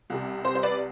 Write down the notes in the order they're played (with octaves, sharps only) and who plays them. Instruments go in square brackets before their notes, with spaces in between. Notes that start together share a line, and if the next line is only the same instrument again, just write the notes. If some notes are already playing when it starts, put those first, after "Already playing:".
[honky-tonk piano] C2 C3 G3
C5
C5
B4 D5